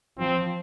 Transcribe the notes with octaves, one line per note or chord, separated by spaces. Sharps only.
F3 C4